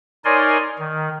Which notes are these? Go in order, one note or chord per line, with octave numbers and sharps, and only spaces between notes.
D#4 A#4 C#5 D5 G#5 C6
D#3